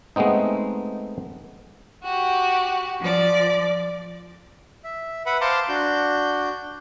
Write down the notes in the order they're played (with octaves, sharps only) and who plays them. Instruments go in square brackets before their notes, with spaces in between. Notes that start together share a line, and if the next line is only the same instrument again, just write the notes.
[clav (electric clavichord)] G#3 A3 B3 C4 D#4
[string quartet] F#4 G4
F3 D5
[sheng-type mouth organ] E5
B4 E5 F#5 B5
C5 F5 A5 A#5 C6 D6
D4 F#4 G6